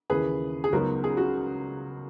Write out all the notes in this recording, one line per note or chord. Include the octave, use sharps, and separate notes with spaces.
D#2 C#3 E3 G#4 B4
G#4
C#2 C#3 F#3 B3 D#4 F#4 A#4
G#4
F#4